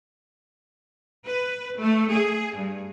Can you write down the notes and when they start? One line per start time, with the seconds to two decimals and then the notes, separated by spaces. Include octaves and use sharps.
1.26 B4
1.79 A3
2.13 G#4
2.56 G2